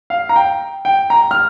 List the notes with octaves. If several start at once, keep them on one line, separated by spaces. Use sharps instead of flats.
F5
A#5
G5
G5
A#5
F6